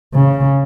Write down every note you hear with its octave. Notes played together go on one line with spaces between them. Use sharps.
C#3